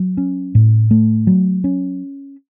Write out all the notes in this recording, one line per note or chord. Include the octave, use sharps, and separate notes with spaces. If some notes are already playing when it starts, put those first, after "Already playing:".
Already playing: F#3
C#4
A2
A3
F#3
C#4